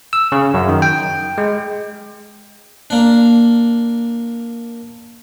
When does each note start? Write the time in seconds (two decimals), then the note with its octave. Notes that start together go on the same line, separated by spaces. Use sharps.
0.13 E6
0.32 C#3
0.54 F#2
0.69 D#3
0.82 G5
1.38 G#3
2.90 A#3 D4